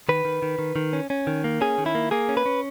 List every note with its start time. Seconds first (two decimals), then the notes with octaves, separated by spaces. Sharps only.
0.09 D#3 B4
0.25 D#3
0.42 D#3
0.59 D#3
0.76 D#3
0.93 C#4
1.10 C#4
1.27 D#3
1.44 A#3
1.61 C#4 G#4
1.78 D#3
1.86 E4
1.95 A#3
2.11 A#3 G#4
2.29 C#4
2.37 B4
2.46 C#4